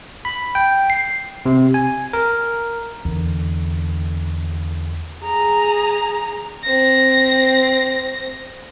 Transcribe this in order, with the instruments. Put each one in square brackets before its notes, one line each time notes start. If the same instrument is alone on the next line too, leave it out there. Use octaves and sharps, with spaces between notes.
[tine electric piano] B5
G5
C7
C3
G#5
A#4
[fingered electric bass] E2 D3
[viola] G#4 A#5
[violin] C4 A#6